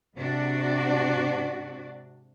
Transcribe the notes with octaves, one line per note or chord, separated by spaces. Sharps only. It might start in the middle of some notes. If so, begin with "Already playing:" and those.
G#2 C3 D4 F#4 D5